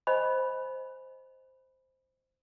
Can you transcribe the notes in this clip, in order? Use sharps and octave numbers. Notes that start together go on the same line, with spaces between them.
C5 D#5 G#5 B5